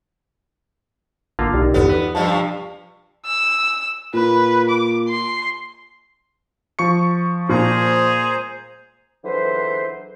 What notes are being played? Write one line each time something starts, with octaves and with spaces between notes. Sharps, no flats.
A1 D3 A#3 F4
B1 D#4 G4 D5
G1 E2 B3
B4
G2 F3 A5
E6
A#2 B4
D6
C6
F3 C#6 C#7
A#2 G#4 C5 A#5
C#2 D3 E3 F#3 B4 C5